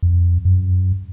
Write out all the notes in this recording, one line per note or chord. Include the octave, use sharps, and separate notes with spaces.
F2
F#2